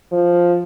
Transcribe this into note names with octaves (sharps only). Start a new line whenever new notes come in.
F3